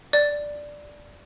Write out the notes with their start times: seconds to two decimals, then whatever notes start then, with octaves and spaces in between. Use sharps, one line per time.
0.13 D5